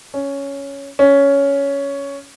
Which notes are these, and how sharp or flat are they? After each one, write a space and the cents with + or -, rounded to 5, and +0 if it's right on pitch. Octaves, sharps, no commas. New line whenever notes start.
C#4 +5
C#4 +10